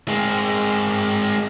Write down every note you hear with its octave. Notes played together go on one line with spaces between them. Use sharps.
G#3 C4